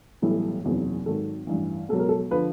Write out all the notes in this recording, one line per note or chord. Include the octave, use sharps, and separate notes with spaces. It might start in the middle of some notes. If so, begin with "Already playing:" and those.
B1 A2 E3 G3 E4
F#1 E2 C3 D#3 F#3
G#1 G#2 D#3 F#3 A4
A1 G2 E3
C#2 B2 F#3 A4
A#4
A4
D3 F3 B4